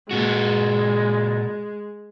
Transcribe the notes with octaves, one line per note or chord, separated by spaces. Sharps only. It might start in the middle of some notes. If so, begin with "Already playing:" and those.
A#2 G#3 F#4